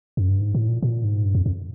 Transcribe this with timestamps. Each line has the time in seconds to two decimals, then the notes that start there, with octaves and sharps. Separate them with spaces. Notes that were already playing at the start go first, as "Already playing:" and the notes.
0.17 F#2
0.29 G2
0.41 G#2
0.55 A2
0.68 A#2
0.82 A#2
1.04 G#2
1.25 G2
1.35 F2
1.46 F2